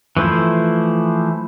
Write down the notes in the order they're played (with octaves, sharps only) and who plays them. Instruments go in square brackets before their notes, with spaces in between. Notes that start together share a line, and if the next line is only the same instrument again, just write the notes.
[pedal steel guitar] E3 F3 A3 E4 C5